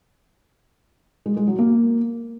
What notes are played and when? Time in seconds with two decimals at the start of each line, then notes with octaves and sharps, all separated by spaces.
1.26 G#3
1.37 G#3
1.48 F#3
1.59 A#3